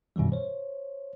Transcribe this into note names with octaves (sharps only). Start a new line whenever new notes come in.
F#2 B2 D#3 E3 G3
C5 C#5